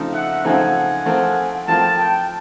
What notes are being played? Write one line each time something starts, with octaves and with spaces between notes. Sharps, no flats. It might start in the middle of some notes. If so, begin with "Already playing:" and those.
Already playing: C#3 F3 A3 C4 D#4
E5 F#5
C#3 F3 A3 C4 D#4 F#5 G#5
F3 A3 C4 F4 A#4
F3 A3 C4 F4 A#4 G5 A5
G5 A5